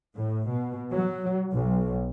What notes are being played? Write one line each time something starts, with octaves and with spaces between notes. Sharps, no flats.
A2
B2
F#3
B1